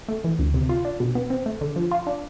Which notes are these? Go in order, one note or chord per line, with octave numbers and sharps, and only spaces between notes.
A3
E3
D2
C3
F4
D4
B2
B3
C4
A3
D3
F3
F4
D4